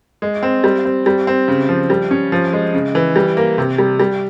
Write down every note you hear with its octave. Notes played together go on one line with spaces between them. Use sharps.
G#3
C4
G3
C4
G3
C4
C#3
F3
G3
C#4
F3
G#3
C#3
E3
G3
A#3
C3
G3
G3